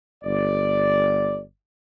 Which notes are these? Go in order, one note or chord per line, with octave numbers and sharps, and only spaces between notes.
G1 D5